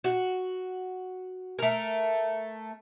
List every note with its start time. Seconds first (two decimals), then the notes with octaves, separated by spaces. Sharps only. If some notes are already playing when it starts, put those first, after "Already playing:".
0.04 F#4
1.59 A3 A#4